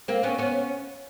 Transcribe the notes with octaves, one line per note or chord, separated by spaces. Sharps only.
A#3 C4
B3 C#4
B3 C#4